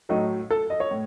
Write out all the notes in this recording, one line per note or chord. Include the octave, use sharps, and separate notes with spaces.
A2 F#3 A3 D#4
A4
D#5
C#5
A2